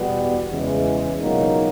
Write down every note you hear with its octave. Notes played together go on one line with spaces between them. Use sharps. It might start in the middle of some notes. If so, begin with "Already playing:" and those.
Already playing: E2 B2 G3 B3
E2 C#3 E3 G#3
C#2 B2 F#3 A#3 D#4